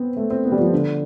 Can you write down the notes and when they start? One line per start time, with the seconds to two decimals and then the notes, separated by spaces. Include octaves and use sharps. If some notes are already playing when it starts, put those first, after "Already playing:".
Already playing: B3 C4
0.16 A3
0.30 C4
0.45 B3
0.52 G3
0.59 F3
0.73 D3